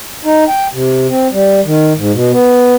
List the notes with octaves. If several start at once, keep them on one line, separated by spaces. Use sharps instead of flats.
D#4
G5
C3
C4
G3
D#3
G#2
B2
B3